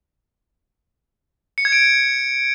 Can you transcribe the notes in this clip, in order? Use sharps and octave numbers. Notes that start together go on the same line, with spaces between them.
C#7
G#6
D7